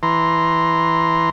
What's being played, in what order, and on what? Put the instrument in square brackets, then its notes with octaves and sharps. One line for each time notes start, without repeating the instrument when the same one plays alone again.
[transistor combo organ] E3 A#5 C6